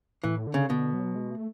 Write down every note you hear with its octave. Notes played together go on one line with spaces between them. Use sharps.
A2 E3
D3
C#3
B2 D3
F#3
G#3
A3